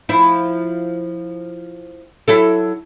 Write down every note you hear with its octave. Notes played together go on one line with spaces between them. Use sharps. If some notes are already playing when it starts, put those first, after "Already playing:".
F3 E4
F#3 E4 A4